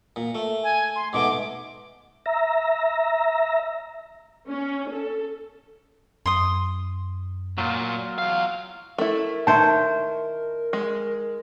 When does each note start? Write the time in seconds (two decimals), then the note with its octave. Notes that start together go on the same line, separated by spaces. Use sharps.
0.16 A#2
0.35 A3
0.64 G#5
0.96 C6
1.13 G#2 B2 A3 D6
2.26 E5 A#5
4.48 C#4
4.90 A4
6.26 F#2 C6 D#6
7.58 A#2 F#3 F4
8.18 E2 F5
8.98 A3 E4 A#4
9.47 D#3 C5 C#5 E5 A5
10.73 G#3